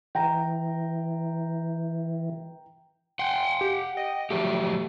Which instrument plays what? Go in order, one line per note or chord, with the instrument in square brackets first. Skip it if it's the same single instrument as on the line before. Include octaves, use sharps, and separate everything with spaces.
[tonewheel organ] E3 [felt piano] G5 A#5
[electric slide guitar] F#5 G5 [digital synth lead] C6
[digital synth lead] G4
D#5
[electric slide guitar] F3 F#3 G4 [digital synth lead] A3